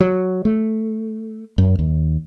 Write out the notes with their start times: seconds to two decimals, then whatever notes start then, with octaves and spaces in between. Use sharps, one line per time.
0.01 F#3
0.45 A3
1.58 F#2
1.79 D#2